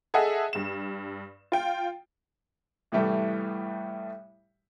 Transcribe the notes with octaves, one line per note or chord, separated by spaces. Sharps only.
G#4 A4 D#5 E5 F#5
G2 E7
F4 G5
C2 A2 E3 G3 A3